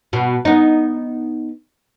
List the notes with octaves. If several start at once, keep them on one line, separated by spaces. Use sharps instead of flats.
B2
B3 D#4